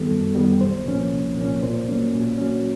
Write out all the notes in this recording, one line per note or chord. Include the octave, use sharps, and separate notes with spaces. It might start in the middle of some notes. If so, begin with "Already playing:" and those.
Already playing: F#2 D#3 G3 B3 A4
F#2
D#3 G3 B3
C2 C5
A#2 F3 A#3 C#4
C2
A#2 F3 A#3 C#4
A#2 C5
F#3 A#3 C#4
A#2
F#3 A#3 C#4